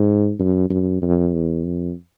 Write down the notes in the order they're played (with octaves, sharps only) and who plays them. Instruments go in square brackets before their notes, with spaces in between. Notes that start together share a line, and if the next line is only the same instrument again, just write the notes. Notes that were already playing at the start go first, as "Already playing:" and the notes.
Already playing: [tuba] G#2
F#2
F#2
F2
E2
F2